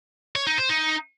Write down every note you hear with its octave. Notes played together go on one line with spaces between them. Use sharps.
C#5
D#4
C5
D#4